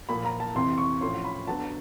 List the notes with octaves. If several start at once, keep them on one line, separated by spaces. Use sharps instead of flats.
A#2 F3 A#3 B5
A#5
A5
F2 C3 E3 C6
C#6
A2 F3 A3 C#4 C6
B5
D3 F#3 B3 D4 A5